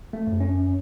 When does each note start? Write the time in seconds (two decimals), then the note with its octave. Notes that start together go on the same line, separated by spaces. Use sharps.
0.13 A3
0.27 F#2
0.40 C#4